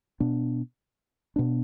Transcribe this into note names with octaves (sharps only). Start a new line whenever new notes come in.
B2 B3 D4
B2 B3 D4